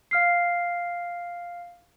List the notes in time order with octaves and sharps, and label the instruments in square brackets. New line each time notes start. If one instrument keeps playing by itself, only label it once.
[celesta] F5 F6 C7